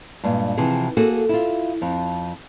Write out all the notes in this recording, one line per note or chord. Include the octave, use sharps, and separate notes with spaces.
G2 A#2 G#3
C3 E3 F3 G#4
A#3 F#4 G#4 A4
E4 F4
F2 F3